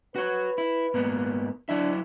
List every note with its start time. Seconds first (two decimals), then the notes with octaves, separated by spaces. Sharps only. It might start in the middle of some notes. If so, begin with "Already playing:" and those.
0.16 F#4 B4 C#5
0.58 E4
0.94 G#2 A#3 B3
1.69 F#3 D4 E4 E5